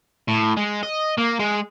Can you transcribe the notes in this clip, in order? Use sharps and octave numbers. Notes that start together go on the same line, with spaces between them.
A2
G#3
D#5
A#3
G#3